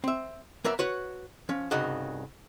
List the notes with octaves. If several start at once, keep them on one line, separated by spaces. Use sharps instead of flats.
C4 E5
F#3 A#3 A#4 B4 E5
F#4 B4 C#5
F3 C#4
C2 G2 C#3 D#4 F#4